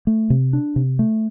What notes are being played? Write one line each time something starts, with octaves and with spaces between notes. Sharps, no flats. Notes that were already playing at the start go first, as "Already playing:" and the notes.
A3
C3
D4
C3
A3